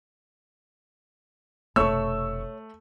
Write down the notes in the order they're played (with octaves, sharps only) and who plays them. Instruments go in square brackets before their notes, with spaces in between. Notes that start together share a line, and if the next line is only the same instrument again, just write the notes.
[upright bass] F1 B2 [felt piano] A3 [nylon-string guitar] C#5 [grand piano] C#6 E6